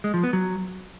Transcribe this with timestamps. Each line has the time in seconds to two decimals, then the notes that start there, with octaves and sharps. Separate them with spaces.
0.04 G#3
0.14 F3
0.23 B3
0.33 F#3